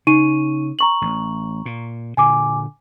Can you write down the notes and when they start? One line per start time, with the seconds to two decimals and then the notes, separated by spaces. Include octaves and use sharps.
0.07 C#3 D#4 C#6 D#7
0.79 A#5 C#6 F#7
1.01 A1
1.66 A#2
2.17 A#2 D3 G#5 D6